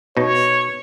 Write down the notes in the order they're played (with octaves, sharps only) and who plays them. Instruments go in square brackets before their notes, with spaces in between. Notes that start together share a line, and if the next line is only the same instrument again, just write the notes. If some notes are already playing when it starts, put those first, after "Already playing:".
[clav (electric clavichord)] B2 D#4 [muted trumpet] C#5